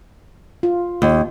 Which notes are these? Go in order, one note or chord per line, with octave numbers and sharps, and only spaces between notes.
F4
D#2